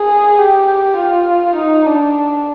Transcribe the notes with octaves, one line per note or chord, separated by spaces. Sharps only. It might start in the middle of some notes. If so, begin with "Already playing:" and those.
Already playing: G#4
G4
F4
D#4
D4